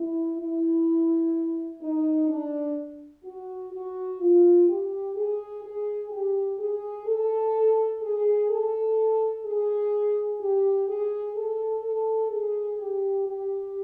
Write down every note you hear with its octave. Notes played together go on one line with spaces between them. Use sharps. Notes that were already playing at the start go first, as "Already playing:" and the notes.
Already playing: E4
E4
D#4
D4
F#4
F#4
F4
G4
G#4
G#4
G4
G#4
A4
G#4
A4
G#4
G4
G#4
A4
A4
G#4
G4
G4